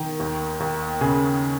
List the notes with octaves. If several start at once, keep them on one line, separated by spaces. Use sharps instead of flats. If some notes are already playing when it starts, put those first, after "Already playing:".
Already playing: D#3
D#2
D#2
C#3 G#4